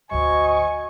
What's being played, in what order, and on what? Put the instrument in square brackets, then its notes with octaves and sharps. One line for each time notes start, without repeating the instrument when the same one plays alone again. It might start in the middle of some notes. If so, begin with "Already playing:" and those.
[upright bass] G#1 D2 [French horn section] F#4 C5 D#5 [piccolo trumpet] G#5 [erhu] C#6